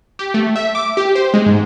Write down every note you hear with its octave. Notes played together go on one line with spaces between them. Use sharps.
G4
A3
E5
D6
G4
C5
G#3
G#2